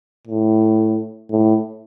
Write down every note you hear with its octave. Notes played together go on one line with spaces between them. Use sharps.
A2
A2